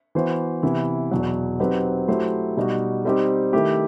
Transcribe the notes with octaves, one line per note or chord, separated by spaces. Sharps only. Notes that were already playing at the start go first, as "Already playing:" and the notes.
E3 B3 F#4 C5
C3 E3 B3 E4
E2 B2 F#3
F#3 C4 D#4 G4 B4
F#3 A3 E4 G4 C5
B2 G3 D#4 F#4
G3 C4 D#4 G4
D#3 A3 E4 G4